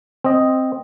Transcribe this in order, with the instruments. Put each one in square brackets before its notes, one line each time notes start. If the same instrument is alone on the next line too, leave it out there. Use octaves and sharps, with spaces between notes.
[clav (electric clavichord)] C4 D#5